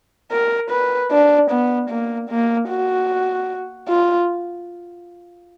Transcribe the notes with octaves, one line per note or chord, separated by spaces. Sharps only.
A#4
B4
D4
B3
A#3
A#3
F#4
F4